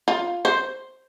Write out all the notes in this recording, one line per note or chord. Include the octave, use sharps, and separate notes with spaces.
F4
C5